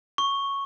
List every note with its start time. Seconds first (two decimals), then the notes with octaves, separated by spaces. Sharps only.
0.18 C#6